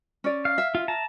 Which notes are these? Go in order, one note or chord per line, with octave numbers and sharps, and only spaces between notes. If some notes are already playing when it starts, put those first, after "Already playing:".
C#4 D5
F5
E5
F4
A5 A#5